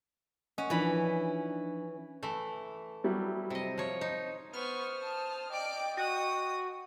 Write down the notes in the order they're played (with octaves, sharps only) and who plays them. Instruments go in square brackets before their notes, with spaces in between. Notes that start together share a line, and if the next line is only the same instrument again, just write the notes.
[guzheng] C#4 [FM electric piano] D#5 F#5
[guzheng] E3 B5 [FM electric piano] F3 D4 D#4
[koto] E3 A3
[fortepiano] F#3 G3 E4
[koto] C3 D#5
F3 C#5
[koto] D#4 [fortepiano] C5
[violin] B3 C#6 [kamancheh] C5 D#6 [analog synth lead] F6
[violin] A5
[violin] D5 D6 [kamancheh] D#5 G5
[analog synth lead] F#4 [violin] D#6